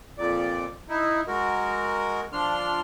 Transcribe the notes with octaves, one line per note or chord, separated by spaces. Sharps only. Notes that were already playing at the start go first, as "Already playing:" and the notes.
F2 A#2 D5
D#4 E4
G#3 F#4 A#4
F3 D4 C6 F6